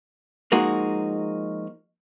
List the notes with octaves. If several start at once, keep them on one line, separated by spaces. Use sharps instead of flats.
F3 G#3 A#3 D#4 F#4